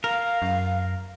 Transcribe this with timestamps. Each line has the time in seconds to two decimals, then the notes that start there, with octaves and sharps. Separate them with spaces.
0.04 A#4 F5
0.42 F#2